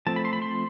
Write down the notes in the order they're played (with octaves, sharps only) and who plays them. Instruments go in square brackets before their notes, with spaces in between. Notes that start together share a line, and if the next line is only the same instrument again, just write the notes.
[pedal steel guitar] F3 A3 C4 A5
B5
C6
B5
C6